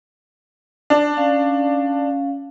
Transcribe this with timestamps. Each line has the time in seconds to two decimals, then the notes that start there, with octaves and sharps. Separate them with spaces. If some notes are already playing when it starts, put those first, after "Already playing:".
0.90 D4
1.17 C#4 F5